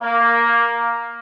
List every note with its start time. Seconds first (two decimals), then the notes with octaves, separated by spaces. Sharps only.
0.01 A#3